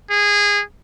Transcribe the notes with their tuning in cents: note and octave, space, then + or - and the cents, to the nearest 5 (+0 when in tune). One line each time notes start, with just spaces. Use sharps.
G#4 -20